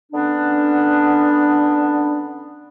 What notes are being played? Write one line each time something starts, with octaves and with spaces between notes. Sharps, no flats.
D3 B3 C#4 D4